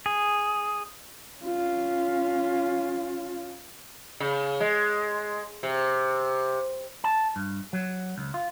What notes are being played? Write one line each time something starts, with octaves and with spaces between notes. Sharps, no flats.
G#4
C#4 F4
C#3
G#3
C3
A5
G2
F#3
C#2
F4